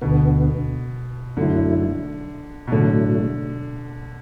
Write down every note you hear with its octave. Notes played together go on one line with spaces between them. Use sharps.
D2 B2 D3 B3
F#2 D3 F#3 A3 E4
B2
A2 D3 F#3 A3